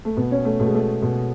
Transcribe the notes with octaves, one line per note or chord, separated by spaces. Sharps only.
A3
B2 B3
C#4
A3
B2 A3
G#3
A3
B2